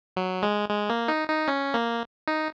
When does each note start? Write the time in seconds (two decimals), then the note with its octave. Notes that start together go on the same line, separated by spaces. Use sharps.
0.17 F#3
0.43 G#3
0.69 G#3
0.89 A#3
1.08 D#4
1.28 D#4
1.48 C#4
1.74 A#3
2.28 D#4